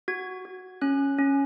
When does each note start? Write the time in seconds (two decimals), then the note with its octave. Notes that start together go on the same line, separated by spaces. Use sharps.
0.08 F#4 G#6
0.45 F#4
0.82 C#4 F#6
1.18 C#4